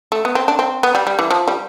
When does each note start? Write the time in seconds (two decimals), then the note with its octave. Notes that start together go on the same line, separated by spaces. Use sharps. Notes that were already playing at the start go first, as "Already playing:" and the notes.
0.12 A3
0.25 B3
0.35 C4
0.48 D4
0.59 C4
0.83 B3
0.95 G3
1.07 G3
1.19 E3
1.30 F3
1.48 G3